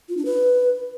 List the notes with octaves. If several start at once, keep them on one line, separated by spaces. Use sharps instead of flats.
F4
D4
B4